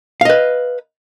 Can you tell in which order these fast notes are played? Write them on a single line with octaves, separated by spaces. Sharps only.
F5 D#5 B4